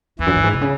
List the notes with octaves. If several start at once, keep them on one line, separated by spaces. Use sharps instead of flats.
E2 E3
F#2
G2
G#2
C3
C#3